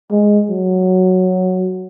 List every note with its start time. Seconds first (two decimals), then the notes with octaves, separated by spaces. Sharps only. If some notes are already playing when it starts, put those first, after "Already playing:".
0.11 G#3
0.50 F#3